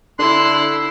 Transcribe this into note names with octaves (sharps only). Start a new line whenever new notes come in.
D3 D4 E4 C6 F#6